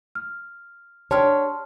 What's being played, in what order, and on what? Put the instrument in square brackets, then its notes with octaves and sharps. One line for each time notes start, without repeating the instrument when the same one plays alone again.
[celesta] F6
[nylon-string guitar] D4 G4 C#5 [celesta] A5 C6 F6